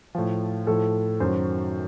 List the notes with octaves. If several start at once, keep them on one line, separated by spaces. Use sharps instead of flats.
A2 F3
A2 F3 A4
F#2 D#3 F#3 C5